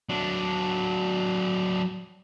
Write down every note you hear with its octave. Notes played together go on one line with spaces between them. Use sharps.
F#3 D4